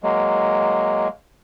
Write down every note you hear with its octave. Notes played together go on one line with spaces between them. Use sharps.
F#3 G#3 A#3